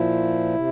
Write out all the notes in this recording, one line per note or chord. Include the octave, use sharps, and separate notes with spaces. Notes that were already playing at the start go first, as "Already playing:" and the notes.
Already playing: A#2 F3 E4
C3